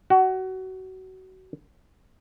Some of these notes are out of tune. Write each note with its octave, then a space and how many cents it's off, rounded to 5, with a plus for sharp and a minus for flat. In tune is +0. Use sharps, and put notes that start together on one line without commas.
F#4 +25